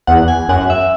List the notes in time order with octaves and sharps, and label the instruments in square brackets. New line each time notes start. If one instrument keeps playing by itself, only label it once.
[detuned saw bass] E2 [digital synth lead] F#5
[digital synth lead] G#5
[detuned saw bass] F#2 [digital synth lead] F#5
[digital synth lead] E5